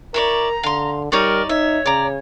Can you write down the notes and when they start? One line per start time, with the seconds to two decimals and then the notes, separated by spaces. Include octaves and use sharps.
0.14 E4 A#4 C#5 D5 A#5
0.63 D3 F5 C6
1.12 G3 D#4 A#4 C#5 D5
1.49 D#4 C#5 E5
1.86 C#3 D5 A#5